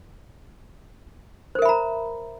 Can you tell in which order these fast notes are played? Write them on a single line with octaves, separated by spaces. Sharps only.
C5 A#4 E5 B5 A#5